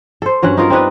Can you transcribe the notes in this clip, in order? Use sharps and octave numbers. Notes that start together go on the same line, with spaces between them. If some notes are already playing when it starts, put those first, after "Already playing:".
A4 C5
G2 F#3 C#4 F#5
D#4 F4 A#4
C4 D4 D#4 B4